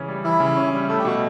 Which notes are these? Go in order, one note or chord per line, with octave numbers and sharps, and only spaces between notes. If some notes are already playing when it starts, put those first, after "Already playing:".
Already playing: C#3 E3 C#4
G3
E3 E4
C#3
C#4
G3
A3 A4
G4
B2 F#4